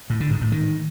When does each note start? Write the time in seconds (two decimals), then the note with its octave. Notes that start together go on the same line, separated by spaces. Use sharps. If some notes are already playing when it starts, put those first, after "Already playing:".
0.10 A2
0.20 D3
0.31 G#2
0.41 A2
0.52 D#3